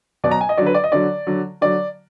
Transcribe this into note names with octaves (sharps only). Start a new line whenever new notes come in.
B2 F#3 D5
A#5
G#5
D#5
D3 F#3 D5
B4
D5
D#5
D3 F#3 D5
D3 F#3
D3 F#3 D5